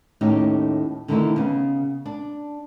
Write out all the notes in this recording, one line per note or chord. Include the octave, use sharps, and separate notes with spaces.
D#2 A2 C#4 D#4 G4
D3 D#3 A3 C4 D#4 E4
C#3 B3
D4